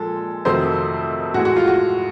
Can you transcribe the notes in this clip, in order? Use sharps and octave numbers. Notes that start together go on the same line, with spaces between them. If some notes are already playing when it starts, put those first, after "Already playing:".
Already playing: A#2 F3 G#3 A4
F2 C3 D#3 F#3 A3 C5
A2 E3 G#3 F#4
F#4
F4
F#4